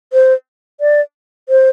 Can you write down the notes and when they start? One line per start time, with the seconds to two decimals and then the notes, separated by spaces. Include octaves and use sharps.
0.13 C5
0.81 D5
1.49 C5